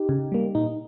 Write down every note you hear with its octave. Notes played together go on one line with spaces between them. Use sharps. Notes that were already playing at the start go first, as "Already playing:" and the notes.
Already playing: D#4 G4
C#3
G3 A#3
A#2 D#4